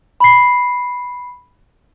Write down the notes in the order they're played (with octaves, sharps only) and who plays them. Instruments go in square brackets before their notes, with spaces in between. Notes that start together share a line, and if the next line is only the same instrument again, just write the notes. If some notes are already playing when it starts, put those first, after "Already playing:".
[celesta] B5 C7